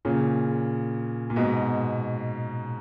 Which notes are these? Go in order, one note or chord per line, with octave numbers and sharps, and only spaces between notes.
A#2 C#3
A#2
G#2 B2